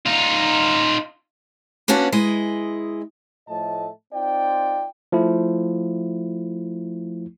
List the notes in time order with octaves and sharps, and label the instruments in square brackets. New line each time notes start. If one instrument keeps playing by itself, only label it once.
[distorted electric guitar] D#4 F4
[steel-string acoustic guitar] A#3 B3 C#4 D4 F#4
G#3 E4 D#5
[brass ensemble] A2 F3 A3 D#5 A5
C4 D#4 F4 D5 G5
[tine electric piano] F3 A3 E4